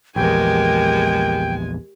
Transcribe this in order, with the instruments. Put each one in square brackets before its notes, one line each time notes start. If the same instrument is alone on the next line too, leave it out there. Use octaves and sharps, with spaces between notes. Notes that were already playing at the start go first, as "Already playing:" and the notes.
[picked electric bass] A#1 E2 [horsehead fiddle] G#3 G#5 [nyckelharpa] G4 A#4 [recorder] G5